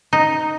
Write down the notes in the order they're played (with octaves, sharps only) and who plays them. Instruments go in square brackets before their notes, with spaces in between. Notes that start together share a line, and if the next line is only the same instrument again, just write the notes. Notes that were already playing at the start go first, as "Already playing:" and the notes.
[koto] D#4